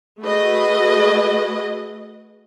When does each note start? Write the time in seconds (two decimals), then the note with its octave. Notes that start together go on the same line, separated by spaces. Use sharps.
0.21 A3 F#4 G#4 B4 D#5